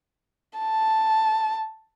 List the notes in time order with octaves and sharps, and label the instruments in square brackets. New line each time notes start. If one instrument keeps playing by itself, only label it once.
[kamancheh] A5